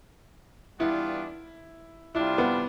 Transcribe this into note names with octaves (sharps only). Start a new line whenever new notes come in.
E3 G3 B3 D4 E4 F4
C3 G3 D4 E4 F4
B3